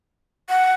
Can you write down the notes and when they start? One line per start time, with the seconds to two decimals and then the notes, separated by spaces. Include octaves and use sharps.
0.50 F#5